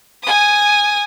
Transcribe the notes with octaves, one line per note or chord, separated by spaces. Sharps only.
G#5 D#6